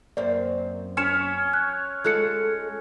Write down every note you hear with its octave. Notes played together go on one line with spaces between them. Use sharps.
F#2 A#3 C4 D5
C#4 C#5 F6 C#7 E7
F#6
G#3 F4 A4 F#6 C#7